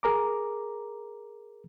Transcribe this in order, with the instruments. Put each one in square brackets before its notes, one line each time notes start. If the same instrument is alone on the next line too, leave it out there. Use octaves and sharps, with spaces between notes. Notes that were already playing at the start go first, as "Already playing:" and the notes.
[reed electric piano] G#4 A#4 A#5 D6